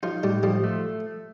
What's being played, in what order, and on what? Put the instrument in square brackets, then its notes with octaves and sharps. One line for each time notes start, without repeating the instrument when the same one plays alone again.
[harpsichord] F3 F4 [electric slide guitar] D#4
[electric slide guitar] A2 [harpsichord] G3 G4
[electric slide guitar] F3 [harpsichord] G3 G4
[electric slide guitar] A3